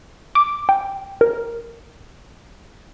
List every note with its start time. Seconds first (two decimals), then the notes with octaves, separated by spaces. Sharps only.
0.35 D6
0.69 G5
1.21 A#4